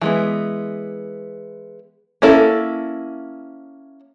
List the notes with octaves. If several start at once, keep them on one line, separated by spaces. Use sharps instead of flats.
E3 G#3 B3
A#3 C#4 E4 A4